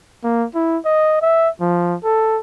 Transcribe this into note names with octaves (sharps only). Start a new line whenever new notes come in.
A#3
E4
D#5
E5
F3
A4